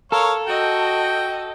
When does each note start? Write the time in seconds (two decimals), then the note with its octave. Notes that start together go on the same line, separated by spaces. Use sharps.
0.12 A4 A#4 C#5 F5
0.47 F#4 D#5 G5